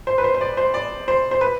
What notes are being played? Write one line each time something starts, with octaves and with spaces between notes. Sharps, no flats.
C5
B4
C5
C5
D5
C5
D5
C5
C5
B4